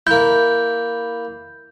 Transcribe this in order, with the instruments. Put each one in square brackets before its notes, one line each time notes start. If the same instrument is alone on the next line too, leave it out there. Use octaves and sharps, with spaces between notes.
[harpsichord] A#3 E4 [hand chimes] G6